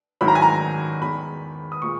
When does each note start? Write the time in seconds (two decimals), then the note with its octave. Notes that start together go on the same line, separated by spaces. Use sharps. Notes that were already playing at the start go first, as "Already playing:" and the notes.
0.21 G#2 D#3 F#3 C#4 E4 B5
0.28 A#5
0.35 G#5
0.42 A#5
1.01 E2 D#3 G#3 B5
1.72 D#6
1.82 A#2 G#3 C#6